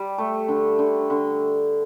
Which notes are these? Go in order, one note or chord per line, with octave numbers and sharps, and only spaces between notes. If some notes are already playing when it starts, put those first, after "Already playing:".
Already playing: G3 D5
A3
D3
D3
D3